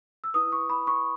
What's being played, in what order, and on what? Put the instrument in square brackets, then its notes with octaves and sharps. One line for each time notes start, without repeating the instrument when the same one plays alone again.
[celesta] E6
E4 B4 D#6
C#6
B5
C#6